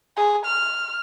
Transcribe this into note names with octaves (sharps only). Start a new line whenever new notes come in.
G#4
F6